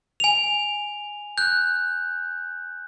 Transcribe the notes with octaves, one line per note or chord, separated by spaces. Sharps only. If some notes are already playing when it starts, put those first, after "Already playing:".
G#5 F7
F#6 G6